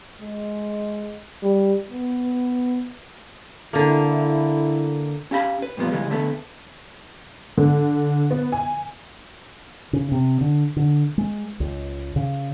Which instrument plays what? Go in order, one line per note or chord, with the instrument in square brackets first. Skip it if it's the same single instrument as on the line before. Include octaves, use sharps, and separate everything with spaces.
[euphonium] G#3
G3
B3
[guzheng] D3 A#3 [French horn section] E4
[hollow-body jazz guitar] C#4 G4 F5 A#5 B5
B4
G2 A#2 F3 B3
C#3 E3 G3 G#3
D3 A3 B3
[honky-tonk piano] D3
B3
G#5
[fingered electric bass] C#3
C3
D3
D3
G#3
C#2
C#3